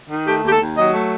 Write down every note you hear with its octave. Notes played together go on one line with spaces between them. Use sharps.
D#3
A3 G4
D#2 G4
A4
D#2
F#3 D#5
A3